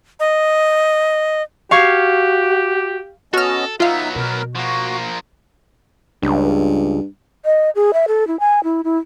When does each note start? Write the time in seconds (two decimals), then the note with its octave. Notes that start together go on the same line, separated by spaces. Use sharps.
0.20 D#5
1.71 F#4 G4 F5 C#6 G#6
3.34 B3 C#4 F#4 A4 D#5 F6
3.80 F#3 B3 D#4 F4 E5 F5
4.15 B2 A#4
4.55 F3 A#3 F#4
6.23 C#2 G2
7.45 D#5
7.75 G#4
7.93 E5
8.08 A4
8.27 E4
8.40 G#5
8.64 E4
8.84 E4